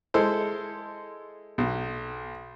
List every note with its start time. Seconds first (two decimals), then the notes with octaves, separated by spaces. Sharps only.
0.14 G#3 E4 A4 C5
1.58 B1